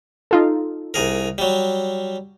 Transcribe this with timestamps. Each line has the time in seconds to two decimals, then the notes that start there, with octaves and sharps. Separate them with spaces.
0.31 D#4 F4 A4
0.94 C2 G#4 A#4
1.38 F#3 G3